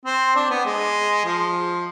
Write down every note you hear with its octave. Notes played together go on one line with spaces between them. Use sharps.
C4
D4
B3
G#3
F3